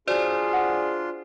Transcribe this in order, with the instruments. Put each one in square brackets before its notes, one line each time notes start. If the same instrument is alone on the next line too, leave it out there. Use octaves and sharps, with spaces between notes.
[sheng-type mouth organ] D4 F4 C6 [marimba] F#4 [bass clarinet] G#4 [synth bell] C5 D5
[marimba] F#5